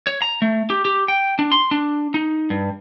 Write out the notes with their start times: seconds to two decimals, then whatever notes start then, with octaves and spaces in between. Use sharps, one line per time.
0.07 C#5
0.22 A#5
0.42 A3
0.70 G4
0.85 G4
1.08 G5
1.39 D4
1.52 C6
1.71 D4
2.14 D#4
2.50 G2